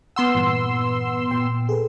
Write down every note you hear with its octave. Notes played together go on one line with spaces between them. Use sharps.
B3 F#5 C6 E6 F6
G2 A#2 E3
A#2 G5
G#4 A4 B4